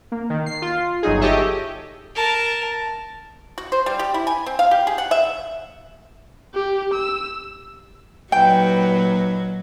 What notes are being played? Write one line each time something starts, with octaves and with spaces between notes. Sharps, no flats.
A#3
D#3
C7
F4
G1 F#3 D#4 G#4
G4 A4 C#5 D#5 E5
A#4 A5
F#4
C5
G3
G4
E4
G#5
C4
F5
G4
G#4
F#5
E5
G4
E6
A#2 F#3 D#4 B4 G5